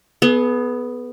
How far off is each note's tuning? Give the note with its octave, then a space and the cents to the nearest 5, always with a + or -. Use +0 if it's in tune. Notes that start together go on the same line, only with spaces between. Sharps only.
B3 +0 G#4 +45